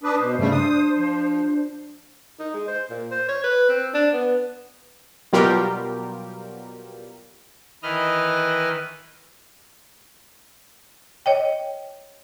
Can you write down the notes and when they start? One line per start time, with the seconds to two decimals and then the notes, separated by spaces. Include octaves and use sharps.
0.03 D4 B4 D6 D#6
0.19 B2 C5
0.38 G2 C#3 G3 A3
0.52 D4 D#6
0.97 F3
2.39 D#4
2.54 G#3
2.67 C5
2.90 A#2
3.11 C5
3.29 C#5
3.43 B4
3.69 C4
3.94 D4
4.13 B3
5.33 B2 F#3 G3 F4 G4 A#4
7.83 D#3 E3 B4 D#5 F6
11.26 C#5 D#5 G5